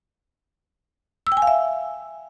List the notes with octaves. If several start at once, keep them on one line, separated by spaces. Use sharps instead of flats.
E6
G5
G#5
F5
E5